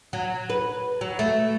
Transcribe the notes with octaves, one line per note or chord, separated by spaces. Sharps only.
F#3
B4
F#3
A3